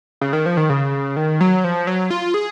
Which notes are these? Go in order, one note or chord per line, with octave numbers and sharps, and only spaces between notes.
C#3
D#3
F3
D#3
C#3
D#3
F#3
F3
F#3
F4
G#4